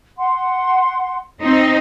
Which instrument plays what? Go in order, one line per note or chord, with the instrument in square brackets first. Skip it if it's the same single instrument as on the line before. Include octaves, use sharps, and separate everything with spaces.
[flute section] F#5 C6
[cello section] C4 D#4